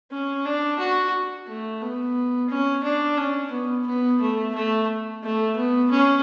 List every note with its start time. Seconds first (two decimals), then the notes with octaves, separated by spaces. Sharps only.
0.11 C#4
0.45 D4
0.79 F#4
1.47 A3
1.81 B3
2.49 C#4
2.83 D4
3.17 C#4
3.52 B3
3.86 B3
4.21 A3
4.54 A3
5.23 A3
5.56 B3
5.91 C#4